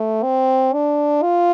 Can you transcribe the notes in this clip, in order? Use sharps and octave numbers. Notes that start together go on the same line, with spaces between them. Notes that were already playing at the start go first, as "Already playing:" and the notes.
Already playing: A3
C4
D4
F4